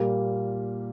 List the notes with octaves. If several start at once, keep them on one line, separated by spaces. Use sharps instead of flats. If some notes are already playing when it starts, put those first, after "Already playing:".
Already playing: A#2 G3 A#3